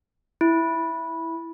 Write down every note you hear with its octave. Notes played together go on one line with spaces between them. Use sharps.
E4